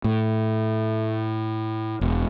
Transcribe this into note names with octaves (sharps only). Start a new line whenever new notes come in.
A2
E1